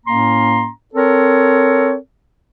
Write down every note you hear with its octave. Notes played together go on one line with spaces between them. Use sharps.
A2 A#3 C#4 A#5 C6
C4 A4 A#4 C#5